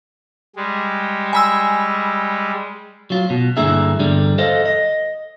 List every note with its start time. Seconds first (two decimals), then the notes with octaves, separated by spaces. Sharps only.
0.56 G3 G#3
1.33 G#5 B5 E6
3.10 F#3 F4
3.30 B2
3.57 G2 D3 A#3 E4 G#4 E5
4.00 E2 G2 D3 G3
4.38 A4 C5 D#5 F5
4.66 D#5